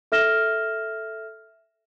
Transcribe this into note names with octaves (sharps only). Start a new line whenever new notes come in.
A4 E5 F6 A#6 E7 G7